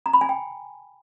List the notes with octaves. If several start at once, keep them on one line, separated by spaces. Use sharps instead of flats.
A#5
B5
G#5
G5